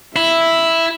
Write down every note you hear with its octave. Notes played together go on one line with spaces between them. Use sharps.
E4 E5